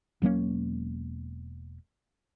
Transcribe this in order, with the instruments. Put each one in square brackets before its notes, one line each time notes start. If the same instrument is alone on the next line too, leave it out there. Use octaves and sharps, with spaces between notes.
[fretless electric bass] E1 F#3 A#3 C#4